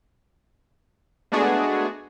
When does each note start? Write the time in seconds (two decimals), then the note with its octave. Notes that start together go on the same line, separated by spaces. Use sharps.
1.32 G#3 A3 B3 D4 F#4 G#4